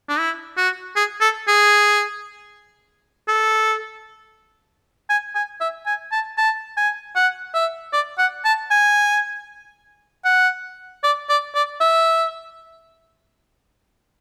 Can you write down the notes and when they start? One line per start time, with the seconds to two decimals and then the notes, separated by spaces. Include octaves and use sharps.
0.09 D4
0.19 E4
0.57 F#4
0.96 G#4
1.21 A4
1.48 G#4
3.28 A4
5.10 G#5
5.35 G#5
5.60 E5
5.86 G#5
6.12 A5
6.38 A5
6.77 G#5
7.16 F#5
7.54 E5
7.93 D5
8.18 F#5
8.45 A5
8.71 G#5
10.25 F#5
11.04 D5
11.29 D5
11.55 D5
11.81 E5